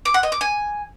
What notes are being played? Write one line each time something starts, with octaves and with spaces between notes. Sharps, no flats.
D6
F#5
D#5
D6
G#5